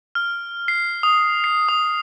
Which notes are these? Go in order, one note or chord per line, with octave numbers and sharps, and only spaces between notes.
F6
C7
D#6
C7
D#6